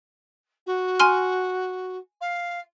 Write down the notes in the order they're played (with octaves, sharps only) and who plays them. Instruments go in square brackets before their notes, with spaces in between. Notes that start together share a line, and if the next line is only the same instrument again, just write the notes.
[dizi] F#4
[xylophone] G#5 C6 F6
[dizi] F5